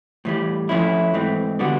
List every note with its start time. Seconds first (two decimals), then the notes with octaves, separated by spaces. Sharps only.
0.25 A2 E3 G3
0.69 F3 A3 C#4 E4
1.14 G#2 E3 A3 C4
1.59 D3 G3 B3 D4 F#4